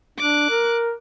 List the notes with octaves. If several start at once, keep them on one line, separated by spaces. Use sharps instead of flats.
D4 D6 F#6
A#4